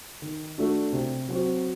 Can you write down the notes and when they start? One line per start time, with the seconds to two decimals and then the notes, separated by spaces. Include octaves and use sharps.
0.22 D#3
0.58 A3 D4 F#4
0.93 C3
1.28 F#3 C4 F#4